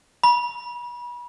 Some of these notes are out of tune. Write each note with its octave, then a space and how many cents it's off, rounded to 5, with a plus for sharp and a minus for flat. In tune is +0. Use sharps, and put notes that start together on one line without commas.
B5 -35